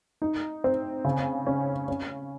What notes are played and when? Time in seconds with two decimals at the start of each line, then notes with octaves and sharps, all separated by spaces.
0.22 D#4
0.64 C4
1.05 C#3
1.47 C#4
1.88 C#4